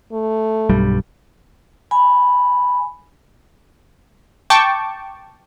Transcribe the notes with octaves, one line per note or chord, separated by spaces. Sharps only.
A3
B1 G2 G3
G#5 B5
G5 A5 C#6 D6